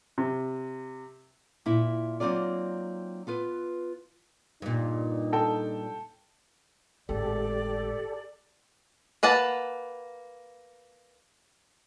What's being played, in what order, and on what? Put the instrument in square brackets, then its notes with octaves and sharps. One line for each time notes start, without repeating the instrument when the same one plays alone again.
[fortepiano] C3
[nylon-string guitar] A#2 E4
F#3 A#3 C4 D#4 F4 D5
B3 F4 B4
[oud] G2 A#2 [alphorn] D#4
[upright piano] A4 G5 A5
[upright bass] G#1 A2 [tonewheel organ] G4 A4 [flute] D5
[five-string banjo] A#3 B4 F#5 A5